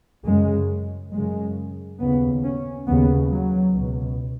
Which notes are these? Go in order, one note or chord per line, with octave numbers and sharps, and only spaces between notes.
F#2 C#3 G#3
F#2 C#3 G#3
D#2 C#3 B3
C#4
D#2 C#3 B3
F#3
C#2 B2